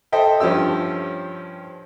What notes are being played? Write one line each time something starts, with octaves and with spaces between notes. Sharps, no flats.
A4 C5 D#5 E5 G5
G2 F3 C#4 G4 E6